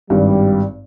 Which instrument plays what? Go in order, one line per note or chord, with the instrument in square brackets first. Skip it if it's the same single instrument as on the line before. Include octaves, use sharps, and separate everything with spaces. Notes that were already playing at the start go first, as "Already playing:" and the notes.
[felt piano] G#1 G2 [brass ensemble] G3